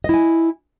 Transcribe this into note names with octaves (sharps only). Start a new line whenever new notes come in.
E4 D#5 G#5